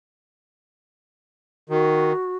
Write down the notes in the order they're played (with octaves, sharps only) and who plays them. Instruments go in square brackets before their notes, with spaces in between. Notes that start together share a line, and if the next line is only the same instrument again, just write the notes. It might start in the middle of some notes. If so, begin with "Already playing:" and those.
[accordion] D#3 [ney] F#4